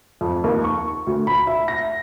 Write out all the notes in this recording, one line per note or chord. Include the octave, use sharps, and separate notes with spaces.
F2
D#2
C#6
D2
B5
E5
A#6